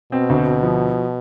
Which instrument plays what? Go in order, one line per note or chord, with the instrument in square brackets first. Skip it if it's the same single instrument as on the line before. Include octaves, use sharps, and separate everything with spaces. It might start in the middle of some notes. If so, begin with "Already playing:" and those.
[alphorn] B2 [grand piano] C4
[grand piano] D2
D2
F3